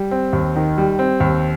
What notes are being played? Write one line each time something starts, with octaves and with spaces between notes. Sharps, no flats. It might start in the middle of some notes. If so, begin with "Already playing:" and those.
Already playing: G3
C4
D#2
D#3
G3
C4
D#2